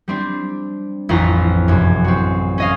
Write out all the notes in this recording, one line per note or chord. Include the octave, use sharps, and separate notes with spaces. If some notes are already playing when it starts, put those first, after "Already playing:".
G3 C4 D4
A1 F2 A3 E4 F4 A#5
F1 F#2
C4 F#4
C#4 D#5 F5